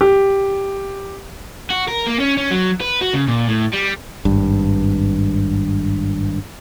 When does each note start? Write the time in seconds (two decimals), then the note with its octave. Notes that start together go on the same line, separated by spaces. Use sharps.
0.01 G4
1.70 F#4
1.88 A#4
2.07 A#3
2.19 C#4
2.37 C#4
2.51 F#3
2.81 B4
3.02 F#4
3.14 C#3
3.28 A#2
3.48 A2
3.73 G3
4.25 G#1 G2